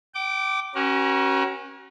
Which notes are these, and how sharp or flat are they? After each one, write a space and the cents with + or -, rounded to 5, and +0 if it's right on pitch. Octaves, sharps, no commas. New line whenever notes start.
G5 -35 D6 +0
C#4 -20 F#4 +35 A#4 +40